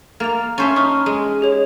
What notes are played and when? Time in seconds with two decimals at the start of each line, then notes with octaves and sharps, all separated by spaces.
0.20 A#3 F6 A6 F7
0.58 C#4 C5 E5 A5 C#6 A6
0.76 D#4 C#6 F6
1.06 G#3
1.41 G4 G#4 C#5